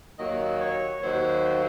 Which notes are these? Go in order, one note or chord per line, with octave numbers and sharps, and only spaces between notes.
D#2 D#3 F#3 A#3 D#5
C#5
D#2 D#3 F#3 A#3 C5